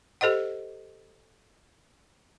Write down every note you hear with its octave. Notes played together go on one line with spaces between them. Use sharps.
G4 A4 C5 D#5 F#5